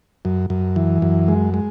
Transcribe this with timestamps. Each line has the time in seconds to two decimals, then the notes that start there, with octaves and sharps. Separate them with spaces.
0.25 F#2
0.50 F#2
0.76 E3
1.02 F#2
1.28 G#3
1.54 G#3